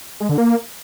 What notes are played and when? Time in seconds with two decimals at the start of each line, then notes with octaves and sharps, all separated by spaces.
0.20 G#3
0.29 D3
0.38 A#3